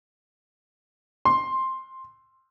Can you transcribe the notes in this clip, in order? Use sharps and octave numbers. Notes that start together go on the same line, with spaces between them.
C6